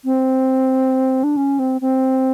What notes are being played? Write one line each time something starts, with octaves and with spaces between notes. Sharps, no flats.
C4
D4
C#4
C4
C4